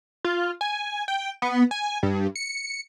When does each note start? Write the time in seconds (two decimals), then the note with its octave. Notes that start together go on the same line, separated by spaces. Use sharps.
0.25 F4
0.61 G#5
1.08 G5
1.42 B3
1.71 G#5
2.03 G2
2.36 C#7